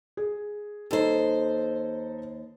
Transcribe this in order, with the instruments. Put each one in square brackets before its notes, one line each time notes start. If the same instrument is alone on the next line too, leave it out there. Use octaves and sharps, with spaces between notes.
[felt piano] G#4
[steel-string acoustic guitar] D#2 C5 [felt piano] D#4 A4